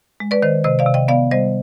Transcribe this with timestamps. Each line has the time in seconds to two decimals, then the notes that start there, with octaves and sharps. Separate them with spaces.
0.20 G#3
0.31 B4 D5
0.42 D#3 C5 D#5
0.64 C3 C5 D#5
0.79 D5 F5
0.86 C3
0.94 D#5 G5
1.08 B3 D5 F5
1.31 G3 C5 D#5